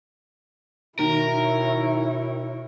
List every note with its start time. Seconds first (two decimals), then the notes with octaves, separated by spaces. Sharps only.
0.99 B2 D#3 E4 A#4 C#5